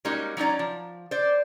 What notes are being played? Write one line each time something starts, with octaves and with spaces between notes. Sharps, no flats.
G3 G#3 A#3 C#4 D#4 F#4
F#3 C#4 D#4 D5
F3
C5 D5